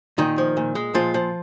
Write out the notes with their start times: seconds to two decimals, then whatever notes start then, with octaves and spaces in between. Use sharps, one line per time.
0.18 A#2 D#3 D#4
0.38 F3
0.57 A#2
0.75 G#3
0.94 A#2 F3 F4
1.14 F3